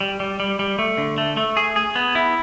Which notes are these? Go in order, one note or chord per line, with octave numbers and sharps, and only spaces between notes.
G3
G3
G3
G3
A3
D3
A3
A3
G#4
G#4
B3
E4